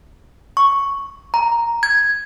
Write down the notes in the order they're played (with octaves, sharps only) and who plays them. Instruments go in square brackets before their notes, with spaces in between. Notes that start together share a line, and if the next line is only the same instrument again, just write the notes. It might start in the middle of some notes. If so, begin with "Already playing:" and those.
[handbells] C#6
A#5
G#6